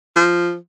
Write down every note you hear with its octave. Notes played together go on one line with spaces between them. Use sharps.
F3